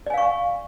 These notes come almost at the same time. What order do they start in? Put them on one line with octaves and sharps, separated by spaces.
D5 G#5 F5 C#6